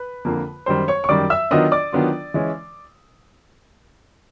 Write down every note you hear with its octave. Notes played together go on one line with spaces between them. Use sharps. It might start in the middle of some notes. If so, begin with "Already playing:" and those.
Already playing: B4 B5
F2 D3 F3 A#3
F#2 D#3 G3 C5 C6
C#5 C#6
C#6
F#2 D#3 G3 D5 D6
E5 E6
D#3 F#3 B3 D4 F4 D#5 D#6
D5 D6
D#3 F#3 B3 D4 F4
E3 G#3 C#4